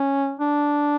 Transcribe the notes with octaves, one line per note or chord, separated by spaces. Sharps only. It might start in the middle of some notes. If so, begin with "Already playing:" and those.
Already playing: C#4
D4